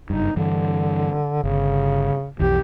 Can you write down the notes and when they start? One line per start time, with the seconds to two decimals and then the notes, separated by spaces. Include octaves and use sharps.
0.10 F#1 G2 D#4
0.36 G2 D3 E3
1.44 G1 C#3
2.39 B1 F2 E3 G4